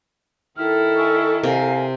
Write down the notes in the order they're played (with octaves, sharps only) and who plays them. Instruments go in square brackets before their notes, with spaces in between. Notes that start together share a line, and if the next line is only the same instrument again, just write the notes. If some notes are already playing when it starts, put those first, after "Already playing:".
[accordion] D#3 F6 [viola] E4 A4
[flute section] G#5 C#6 E6
[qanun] C3 [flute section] A#4 F5 G#5